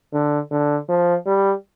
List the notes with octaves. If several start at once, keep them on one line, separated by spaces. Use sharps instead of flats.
D3
D3
F3
G3